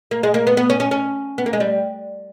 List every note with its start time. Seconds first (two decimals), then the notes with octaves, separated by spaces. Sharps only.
0.11 A#3
0.23 G#3
0.34 A#3
0.47 B3
0.57 B3
0.70 C#4
0.80 C#4
0.91 C#4
1.38 B3
1.46 A#3
1.53 G#3
1.60 G3